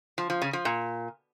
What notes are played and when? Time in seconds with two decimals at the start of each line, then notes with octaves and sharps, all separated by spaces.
0.18 F3
0.30 F3
0.42 C#3
0.53 F3
0.65 A#2